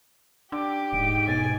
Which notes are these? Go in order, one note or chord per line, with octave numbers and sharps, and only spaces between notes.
D4 G4 D6
D#1 G#2 D7
B2 G#5 A6